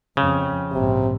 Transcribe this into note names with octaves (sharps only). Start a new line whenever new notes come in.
F2 C#3 C4
A#1 G#2 C3